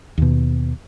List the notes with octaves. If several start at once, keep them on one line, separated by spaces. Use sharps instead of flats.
D#2 B2